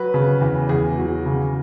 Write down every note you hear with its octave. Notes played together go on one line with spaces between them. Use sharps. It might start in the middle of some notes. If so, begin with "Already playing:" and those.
Already playing: F#3 B4
C#3
E2
E2 G#4
F#3
C#3